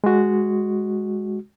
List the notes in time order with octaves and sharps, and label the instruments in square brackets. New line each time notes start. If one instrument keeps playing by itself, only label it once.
[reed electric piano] G#3 F#4